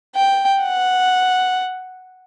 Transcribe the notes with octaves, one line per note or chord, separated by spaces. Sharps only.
G5
F#5